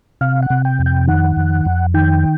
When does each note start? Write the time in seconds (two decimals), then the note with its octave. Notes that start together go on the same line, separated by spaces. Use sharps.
0.21 C3 F5
0.43 F#5
0.50 C3
0.65 G5
0.79 F2
0.86 G5
1.07 D#3 F#5
1.36 F2
1.65 F2
1.94 D#3 G5